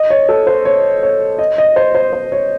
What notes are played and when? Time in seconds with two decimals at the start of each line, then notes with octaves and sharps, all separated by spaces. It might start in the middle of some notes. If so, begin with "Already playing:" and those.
Already playing: D#5
0.10 C#5
0.29 A4
0.47 C5
0.65 C#5
1.03 C#5
1.39 D#5
1.58 D#5
1.76 C5
1.95 C5
2.13 C5
2.32 C#5